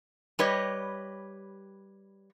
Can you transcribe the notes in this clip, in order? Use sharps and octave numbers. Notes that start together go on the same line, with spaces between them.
G3 G4 B4 C#5 D#5